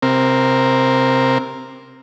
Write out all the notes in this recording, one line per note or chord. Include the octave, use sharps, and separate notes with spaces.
C3 C4 A#4